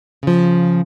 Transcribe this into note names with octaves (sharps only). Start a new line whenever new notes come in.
C#3 F3